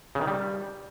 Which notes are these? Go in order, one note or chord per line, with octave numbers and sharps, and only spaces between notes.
C#3
D#3
G3